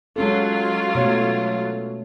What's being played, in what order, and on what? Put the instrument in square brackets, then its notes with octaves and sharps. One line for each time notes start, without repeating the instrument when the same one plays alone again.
[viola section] F#3 F4 [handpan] G#3 C#4 A4
[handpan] B2 A3 C#5